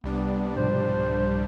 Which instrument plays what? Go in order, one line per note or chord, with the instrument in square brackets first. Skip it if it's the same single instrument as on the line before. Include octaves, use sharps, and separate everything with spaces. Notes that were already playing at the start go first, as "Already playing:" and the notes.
[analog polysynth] C2 G3 D4 [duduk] B3
[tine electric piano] G#2 B2 F3 [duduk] C5